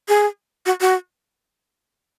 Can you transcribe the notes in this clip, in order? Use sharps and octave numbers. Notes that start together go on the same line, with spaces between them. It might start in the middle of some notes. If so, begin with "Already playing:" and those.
G#4
F#4
F#4